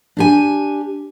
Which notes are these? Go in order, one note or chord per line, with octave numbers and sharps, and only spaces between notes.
D4 G4 G#5